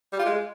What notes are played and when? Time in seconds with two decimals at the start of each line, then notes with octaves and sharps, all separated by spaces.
0.13 G3
0.19 F4
0.26 G#3